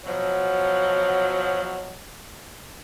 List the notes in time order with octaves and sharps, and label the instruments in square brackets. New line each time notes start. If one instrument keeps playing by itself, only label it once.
[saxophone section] B2 F3 F#3